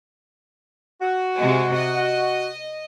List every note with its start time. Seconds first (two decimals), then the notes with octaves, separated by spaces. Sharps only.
1.02 F#4
1.36 C3 G#3
1.75 D#5